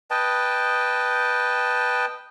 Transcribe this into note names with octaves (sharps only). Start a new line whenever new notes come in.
B4 D#5 G5 A5